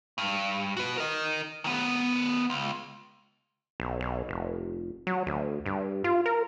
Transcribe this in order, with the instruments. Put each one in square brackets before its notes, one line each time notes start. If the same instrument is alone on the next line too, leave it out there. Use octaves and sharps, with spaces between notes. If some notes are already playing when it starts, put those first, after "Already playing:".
[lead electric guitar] G2
F#4 B4
A#4 D#5
D#3 B3
C#2
[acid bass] B1
B1
F1
F#3
D2
G2
F4
A#4